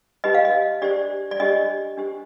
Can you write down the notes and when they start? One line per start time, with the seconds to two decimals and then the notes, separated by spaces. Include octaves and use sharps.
0.24 D#4 G4 B4 D#5
0.35 F5
0.45 D#5
0.82 D4 G4 C5 D5
1.31 D5
1.40 D4 G4 C5 D#5
1.97 D4 G4 C5